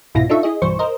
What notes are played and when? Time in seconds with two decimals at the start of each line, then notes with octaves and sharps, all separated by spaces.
0.15 C2 G#2 B2 E4 F4 A#6
0.29 D4 D#4 F4 A4 E5 C#6
0.43 E4 G#4 D#5
0.62 B1 G2 E3 C5 C#6
0.79 A#4 C5 D#5